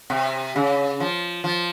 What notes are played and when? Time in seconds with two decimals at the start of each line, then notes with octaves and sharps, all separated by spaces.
0.10 C3
0.56 C#3
1.00 F3
1.44 F3